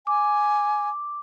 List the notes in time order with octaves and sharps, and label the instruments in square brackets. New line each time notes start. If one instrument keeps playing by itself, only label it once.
[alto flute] G#5 [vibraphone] D6